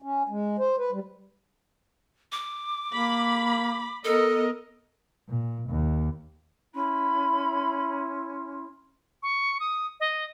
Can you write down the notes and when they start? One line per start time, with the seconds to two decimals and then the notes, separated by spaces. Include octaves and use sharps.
0.02 C#4
0.29 G#3
0.59 C5
0.78 B4
0.92 G3
2.32 D6
2.94 A#3 B5
4.05 B3 A4 A#4 D#5
5.29 A#2
5.69 D#2
6.75 C#4 E4 B5 C6
9.23 C#6
9.60 D#6
10.00 D#5